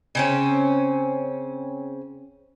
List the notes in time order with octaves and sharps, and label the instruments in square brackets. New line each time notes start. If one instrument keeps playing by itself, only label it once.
[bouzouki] C#3 C4 C#4